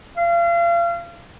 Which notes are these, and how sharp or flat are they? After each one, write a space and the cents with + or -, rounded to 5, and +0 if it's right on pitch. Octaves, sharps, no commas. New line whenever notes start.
F5 -35